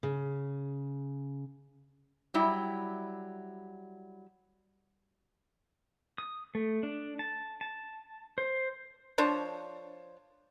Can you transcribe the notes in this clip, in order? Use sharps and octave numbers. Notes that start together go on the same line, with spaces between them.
C#3
F#3 G3 E4
D#6
A3
D4
A5
A5
C5
F3 D4 C5 C#5